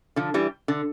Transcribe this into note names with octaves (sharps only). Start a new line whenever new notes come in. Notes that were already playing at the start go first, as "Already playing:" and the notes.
D3 F3
E3 G3
D3